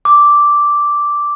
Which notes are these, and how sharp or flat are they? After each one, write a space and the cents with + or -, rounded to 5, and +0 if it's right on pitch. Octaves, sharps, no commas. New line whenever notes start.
D6 -5